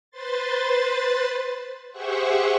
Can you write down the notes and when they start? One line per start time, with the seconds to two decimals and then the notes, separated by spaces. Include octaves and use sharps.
0.11 B4 C5 C6 A6
1.91 G4 G#4 C5 E5 F#5 C#6